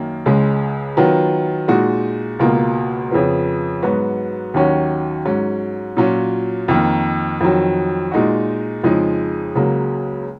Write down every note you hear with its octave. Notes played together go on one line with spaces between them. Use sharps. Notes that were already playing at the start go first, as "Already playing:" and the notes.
Already playing: F#2 D#3 A#3
C#2 C#3 G#3
D#3 F#3 B3 F4
A#2 G#3 D#4 F#4
C#2 B2 A#3 F4
F2 C#3 F3 B3
G#2 F#3 B3 F#4
D#2 D#3 F#3 C#4 F#4
G#2 F#3 C#4
A#2 F#3 C#4 F4
F2 D#3 A#3
F2 D#3 F#3
A#2 G#3 D#4 F#4
F2 C#3 F3 G#3 D#4
C#2 C#3 F#3 A#3